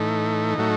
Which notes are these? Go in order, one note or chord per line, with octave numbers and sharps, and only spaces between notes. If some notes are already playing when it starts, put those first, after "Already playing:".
Already playing: A2 E3 A3 D#4
A2 F#3 A3